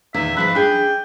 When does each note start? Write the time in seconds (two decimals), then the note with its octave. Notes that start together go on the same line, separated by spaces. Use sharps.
0.14 E2 A#2 D#3 E5
0.37 G#2 F3 G#3 B4
0.55 D4 G#4 G5